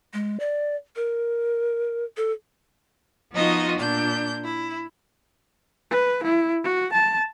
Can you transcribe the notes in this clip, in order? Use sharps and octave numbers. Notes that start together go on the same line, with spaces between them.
G#3
D5
A#4
A4
F3 B3 D#4 F4 F#4 D#5
A#2 D4 G6
E4
B4
E4
F#4
A5